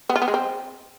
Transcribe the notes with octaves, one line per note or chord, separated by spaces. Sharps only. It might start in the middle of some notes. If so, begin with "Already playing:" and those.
B3
F4
B3
G#3
C4